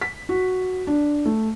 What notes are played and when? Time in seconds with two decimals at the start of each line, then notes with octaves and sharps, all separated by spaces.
0.01 B6
0.29 F#4
0.87 D4
1.26 A3